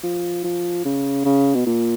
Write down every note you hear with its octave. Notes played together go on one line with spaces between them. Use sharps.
F3
F3
C#3
C#3
B2
A#2